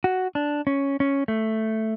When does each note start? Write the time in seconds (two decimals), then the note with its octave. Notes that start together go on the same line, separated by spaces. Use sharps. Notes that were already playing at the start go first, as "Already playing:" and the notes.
0.04 F#4
0.35 D4
0.67 C#4
1.00 C#4
1.28 A3